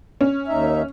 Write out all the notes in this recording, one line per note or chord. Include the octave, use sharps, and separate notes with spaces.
C#4
D#2 D#4 E5